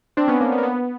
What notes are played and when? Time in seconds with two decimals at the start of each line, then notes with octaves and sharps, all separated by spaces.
0.17 C4 D4
0.28 B3 C#4
0.41 A#3
0.52 B3
0.58 A#3
0.63 B3